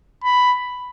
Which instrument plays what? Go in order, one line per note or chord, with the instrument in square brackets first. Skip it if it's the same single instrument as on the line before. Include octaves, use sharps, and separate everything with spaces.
[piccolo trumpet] B5